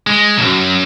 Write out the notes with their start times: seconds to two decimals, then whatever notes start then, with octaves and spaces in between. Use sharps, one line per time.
0.07 G#3
0.38 B1 F#2